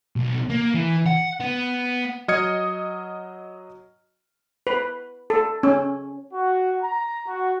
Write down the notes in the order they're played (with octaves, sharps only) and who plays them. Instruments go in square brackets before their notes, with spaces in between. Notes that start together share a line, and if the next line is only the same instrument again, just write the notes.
[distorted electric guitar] B1
A#3
E3
F#5
B3
[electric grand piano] F#3 D#5 D#6 F6 G#6 C#7
[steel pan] B4
A4
C#4
[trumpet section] F#4
A#5
F#4